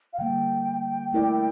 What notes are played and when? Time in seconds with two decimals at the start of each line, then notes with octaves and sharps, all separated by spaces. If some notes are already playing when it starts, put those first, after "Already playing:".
0.13 F5
0.19 D3 G3 A#3 G5
1.13 A3 E4 A#4 D5